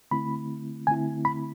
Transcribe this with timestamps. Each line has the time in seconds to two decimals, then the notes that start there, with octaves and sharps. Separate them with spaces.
0.11 D3 A3 C4 E4 B5
0.87 D3 A3 C4 E4 G#5
1.25 B5